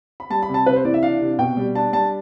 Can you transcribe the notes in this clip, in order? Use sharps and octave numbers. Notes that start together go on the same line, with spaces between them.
B5
G3 A5
B5
C3
A5
C3 B4
C5
E3 D5
E5
D4 F5
C3
B2 G5
G3
D4 A5
G3 A5